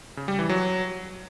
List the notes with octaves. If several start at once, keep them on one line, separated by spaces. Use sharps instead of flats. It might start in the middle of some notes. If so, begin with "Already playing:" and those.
C#3
G3
E3
F#3